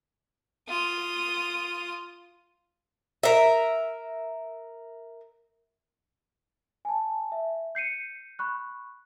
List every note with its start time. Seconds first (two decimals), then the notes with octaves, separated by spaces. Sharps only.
0.69 F4 D#6
3.23 A#4 E5
6.85 G#5 A5
7.32 E5
7.75 G6 C7 C#7 D#7
8.39 B5 C#6 F#6